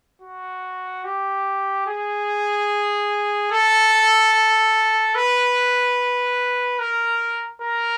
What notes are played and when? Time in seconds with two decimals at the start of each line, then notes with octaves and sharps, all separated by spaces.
0.22 F#4
1.04 G4
1.87 G#4
3.51 A4
5.15 B4
6.79 A#4
7.62 A#4